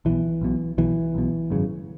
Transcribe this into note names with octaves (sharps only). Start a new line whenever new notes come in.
B1 B2 E3
B1 B2
B1 B2 E3
B1 B2
G#1 F#2 C#3